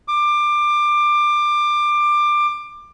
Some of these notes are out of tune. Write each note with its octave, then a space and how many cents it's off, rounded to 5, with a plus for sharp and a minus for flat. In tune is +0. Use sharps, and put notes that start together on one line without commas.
D6 +20